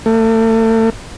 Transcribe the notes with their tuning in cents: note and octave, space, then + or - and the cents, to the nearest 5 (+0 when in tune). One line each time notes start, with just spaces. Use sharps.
A3 +35